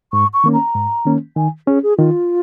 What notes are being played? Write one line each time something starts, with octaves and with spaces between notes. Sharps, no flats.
G#2 C#6
C#6
D#3 A#3 C#4
A#5
G#2
D#3 A#3 C#4
D#3 G#5
C#4 G#4
G#4
D#3 F4